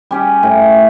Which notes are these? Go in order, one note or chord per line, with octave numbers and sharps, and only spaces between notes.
G3 C#4 G4
A2